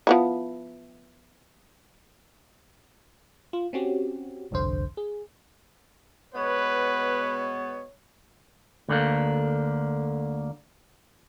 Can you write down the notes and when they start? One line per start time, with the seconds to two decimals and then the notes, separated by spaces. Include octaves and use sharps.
0.07 F3 B3 E4
3.53 F4
3.73 C4 C#4 F#4 G4
4.51 G1 C2 F2 D3 C5
4.97 G#4
6.34 B2 G#3 B3 B4 C#5
8.89 D2 D3 A#3